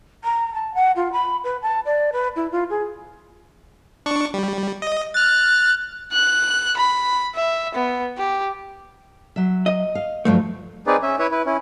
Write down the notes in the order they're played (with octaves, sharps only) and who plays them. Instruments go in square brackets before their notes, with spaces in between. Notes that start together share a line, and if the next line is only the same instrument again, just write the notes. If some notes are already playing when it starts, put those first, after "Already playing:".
[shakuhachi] A#5
A5
F#5
F4
B5
B4
A5
D5
B4
E4
F4
G#4
[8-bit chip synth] D4 C#6
G3
D#5
[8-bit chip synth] F6 A6 [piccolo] F#6
[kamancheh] F#6
B5
E5
B3
G4
[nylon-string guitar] F#3 E5
[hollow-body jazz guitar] D#5
[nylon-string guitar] F5
[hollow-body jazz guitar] D2 F3 A3 [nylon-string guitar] G2 F#3
[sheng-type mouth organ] C4 D#4 G#4 B4 D5
C#4 E5
E4 B4 C#5 E5
E4 B4
C#4 E4